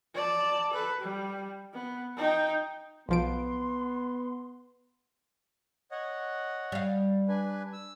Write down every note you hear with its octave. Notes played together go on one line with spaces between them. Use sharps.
D5 A5
A4 B4
G3
B3
D#4 G5
B1 F3 B3 C6 D7
C#5 D#5 F#5
G3 F5
D4 B4 G#5
E6